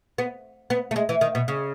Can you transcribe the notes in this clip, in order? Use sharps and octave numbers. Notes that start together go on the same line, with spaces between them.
B3
B3
A3
G#3
E3
D#3
B2
C#3